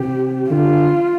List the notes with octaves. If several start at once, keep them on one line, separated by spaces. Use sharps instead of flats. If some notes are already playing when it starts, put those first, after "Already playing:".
Already playing: C3 G4
D3 F4